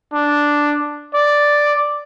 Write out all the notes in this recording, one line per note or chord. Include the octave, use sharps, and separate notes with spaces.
D4
D5